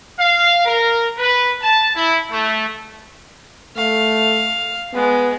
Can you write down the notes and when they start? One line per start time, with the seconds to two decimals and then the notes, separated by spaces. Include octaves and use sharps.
0.19 F5
0.65 A#4
1.18 B4
1.62 A5
1.96 E4
2.30 A3
3.77 A3 F5
4.94 G#3 B3